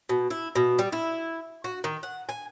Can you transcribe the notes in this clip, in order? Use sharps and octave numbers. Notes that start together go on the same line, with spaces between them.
B2
E4
B2
G3
E4
F#4
D#3
F#5
G#5